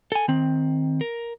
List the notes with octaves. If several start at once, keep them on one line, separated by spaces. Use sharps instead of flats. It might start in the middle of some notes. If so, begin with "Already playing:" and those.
A4 G#5
D#3 C4
A#4